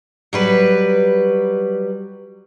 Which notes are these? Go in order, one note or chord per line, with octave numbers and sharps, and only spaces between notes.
F#3 G3 B4